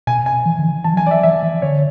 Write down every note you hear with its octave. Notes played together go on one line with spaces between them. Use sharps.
B2 G#5
G#5
E3
D3
E3
E3 A5
F#3 G#5
E3
D5
E5
E3 E5
E3
D3 C#5